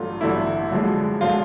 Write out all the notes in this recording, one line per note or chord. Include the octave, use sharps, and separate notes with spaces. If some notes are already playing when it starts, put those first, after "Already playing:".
Already playing: A1 G2 D3 F#3 A3 F4
A1 G2 D3 F#3 A3 E4
F#2 D3 F3 G#3
D3 F3 G#3 F4